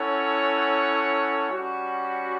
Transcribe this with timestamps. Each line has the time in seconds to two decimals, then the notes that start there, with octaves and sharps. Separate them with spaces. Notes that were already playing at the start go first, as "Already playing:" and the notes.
Already playing: C#4 E4 A4 C#5 F#5
1.50 G3 C#4 F#4